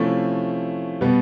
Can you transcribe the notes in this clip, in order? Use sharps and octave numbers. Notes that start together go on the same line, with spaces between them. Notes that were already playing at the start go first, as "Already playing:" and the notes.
Already playing: C3 F3 A3 C#4 E4
B2 G3 B3